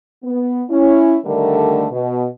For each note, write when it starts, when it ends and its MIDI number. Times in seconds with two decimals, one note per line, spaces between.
0.24 0.63 59
0.70 1.16 61
0.70 1.16 64
1.25 1.86 38
1.25 1.86 50
1.25 1.86 51
1.25 1.86 55
1.25 1.86 57
1.25 1.86 70
1.91 2.27 47